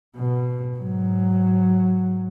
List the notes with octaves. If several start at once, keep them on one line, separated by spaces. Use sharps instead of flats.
B2
G#2 F#3